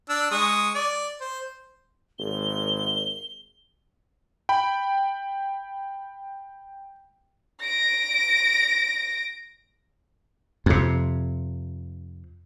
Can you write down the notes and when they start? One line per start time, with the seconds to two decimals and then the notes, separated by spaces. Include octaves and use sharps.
0.09 D4 E6
0.31 G#3 C#6 D#6
0.75 D5
1.21 C5
2.19 G#1 G7
4.49 G5 B5
7.61 A#6 D7
10.66 F2 C3